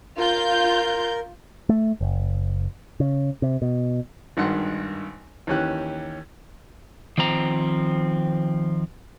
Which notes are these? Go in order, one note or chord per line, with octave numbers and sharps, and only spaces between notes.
F4 A#4 G6
A3
F#1
C#3
C3
B2
G#1 G2 D#3 F#5 C6 F#6
D#2 E3 C#4 G4 F#6
D#3 F3 C4 A#5